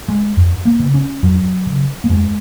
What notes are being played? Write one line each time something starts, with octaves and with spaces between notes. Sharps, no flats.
G#3
F2
A#3
C#3
C#4
F2 F#3
C#3
A#3
F2 G#3